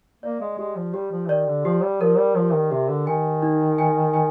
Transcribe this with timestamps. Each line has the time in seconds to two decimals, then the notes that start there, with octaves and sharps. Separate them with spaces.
0.23 A#3 D5
0.41 G#3
0.58 G#3 G4
0.76 F3
0.94 G3 G4
1.11 F3
1.29 D#3 D5
1.47 D3
1.65 F3 G4
1.83 G3
2.01 F3 A#4
2.18 G3
2.36 F3 G4
2.54 D#3
2.71 C3 G4
2.89 D3
3.07 D#3 G#5
3.42 D#4
3.78 G#5
4.14 G#5